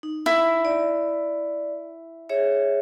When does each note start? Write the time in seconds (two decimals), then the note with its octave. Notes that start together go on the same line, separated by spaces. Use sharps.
0.03 D#4
0.26 E4
0.65 D5
2.29 G#4 C#5 E5